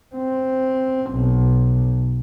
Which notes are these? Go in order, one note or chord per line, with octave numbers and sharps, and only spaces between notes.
C4
B1